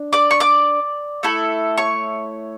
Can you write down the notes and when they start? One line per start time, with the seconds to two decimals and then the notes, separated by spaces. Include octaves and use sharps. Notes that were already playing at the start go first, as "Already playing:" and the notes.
Already playing: D4
0.13 D5 D6
0.31 C#6
0.40 D5 D6
1.23 A3 E4 A4
1.77 C#5 C#6